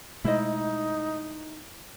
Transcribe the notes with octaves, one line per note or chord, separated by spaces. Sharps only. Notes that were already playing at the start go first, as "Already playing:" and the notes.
B2 G#3 A3 D#4 E4 C5 D#5